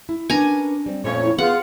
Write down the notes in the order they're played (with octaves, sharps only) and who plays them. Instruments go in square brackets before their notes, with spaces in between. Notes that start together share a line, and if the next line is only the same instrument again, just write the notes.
[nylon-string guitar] E4
[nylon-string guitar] C#4 A#4 B4 [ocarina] D4 [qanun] G#5 A#5
[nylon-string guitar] G3 C4
[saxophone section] F2 C#5 [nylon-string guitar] A#2 A3 C#4
[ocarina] E4
[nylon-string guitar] B3 [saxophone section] F4 [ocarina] G#4 [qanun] F#5